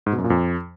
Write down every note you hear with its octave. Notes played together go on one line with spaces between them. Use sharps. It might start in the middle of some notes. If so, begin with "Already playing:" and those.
G#2
B2
F#2
A#2
F2